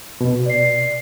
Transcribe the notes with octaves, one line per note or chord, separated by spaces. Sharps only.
B2
D5 C7